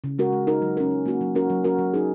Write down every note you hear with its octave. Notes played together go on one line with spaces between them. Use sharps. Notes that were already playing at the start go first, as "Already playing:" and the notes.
C#3
G#3 F#4 A#4
G#3
D#4 A#4
F#3
C#4 A#4
F#3
A#3 F#4
F#3
C#4 F#4 A#4
F#3
C#4 F#4 A#4
F#3
D#4 G#4